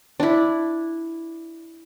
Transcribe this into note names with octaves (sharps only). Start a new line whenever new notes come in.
D4 E4